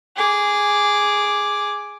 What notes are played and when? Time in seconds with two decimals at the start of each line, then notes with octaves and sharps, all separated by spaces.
0.16 G#4 D6